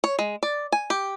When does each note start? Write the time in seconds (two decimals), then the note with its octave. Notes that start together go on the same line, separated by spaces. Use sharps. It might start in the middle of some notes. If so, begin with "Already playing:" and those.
0.04 C#5
0.19 G#3
0.43 D5
0.72 G#5
0.90 G4